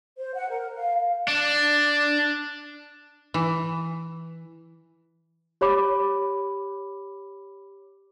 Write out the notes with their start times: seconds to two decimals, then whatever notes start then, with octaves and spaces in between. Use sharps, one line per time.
0.18 C5
0.35 F#5
0.50 A#4
0.76 F5
1.28 D4
3.34 E3
5.61 G4 C#5 B5 D6